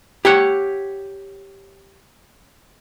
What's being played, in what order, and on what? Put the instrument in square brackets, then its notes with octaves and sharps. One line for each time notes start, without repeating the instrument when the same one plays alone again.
[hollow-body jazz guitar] G4 C#5 F#5